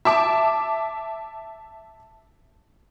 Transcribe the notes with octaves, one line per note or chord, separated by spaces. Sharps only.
E5 A5 D6